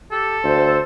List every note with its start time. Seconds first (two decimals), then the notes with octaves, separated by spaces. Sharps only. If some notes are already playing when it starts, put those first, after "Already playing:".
0.12 G4 A4
0.44 D2 C5